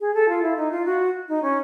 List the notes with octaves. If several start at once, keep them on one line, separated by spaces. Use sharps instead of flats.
G#4
A4
F4
E4
D#4
F4
F#4
D#4
C#4